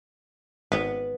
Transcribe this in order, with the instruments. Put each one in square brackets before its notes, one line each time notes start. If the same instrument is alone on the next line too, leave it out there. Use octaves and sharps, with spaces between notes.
[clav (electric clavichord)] G#1 [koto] B3 B4